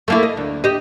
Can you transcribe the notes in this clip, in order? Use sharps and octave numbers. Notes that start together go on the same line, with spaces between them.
A3 A#3 E4
D#5
D2
G4 D#5